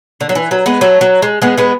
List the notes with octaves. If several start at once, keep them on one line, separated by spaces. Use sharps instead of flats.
D3
F#3
E3
F#3
G#3 B3
F#3 A3
F#3
G#3
G#3 B3
G#3 B3